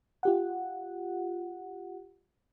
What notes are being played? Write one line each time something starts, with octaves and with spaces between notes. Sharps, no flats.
F4 G4 F#5